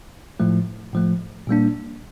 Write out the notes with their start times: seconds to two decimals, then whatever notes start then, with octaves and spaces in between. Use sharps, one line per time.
0.40 A2 F3 A3
0.93 A2 F3 A3
1.47 A#2 G3 A#3 D4